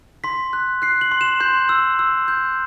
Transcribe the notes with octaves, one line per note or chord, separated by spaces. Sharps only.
C6 B6
F#6
F#6 C7
F#7
C6
E7
C6 G6
E6
E6
G6